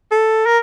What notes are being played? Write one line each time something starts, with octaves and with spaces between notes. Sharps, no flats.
A4
A#4